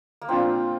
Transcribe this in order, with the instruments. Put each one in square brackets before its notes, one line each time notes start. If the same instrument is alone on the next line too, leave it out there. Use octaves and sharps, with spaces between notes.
[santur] A#3
[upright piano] A#2 F3 D4 F4 [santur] C4